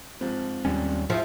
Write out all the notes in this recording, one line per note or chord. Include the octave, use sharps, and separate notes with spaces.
G#2 F3 C4
D#2 G3 C#4
F3 E4 G#4 E5